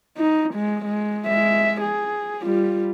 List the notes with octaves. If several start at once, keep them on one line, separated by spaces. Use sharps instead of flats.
D#4
G#3
G#3
G#3 E5
G#4
G3 F4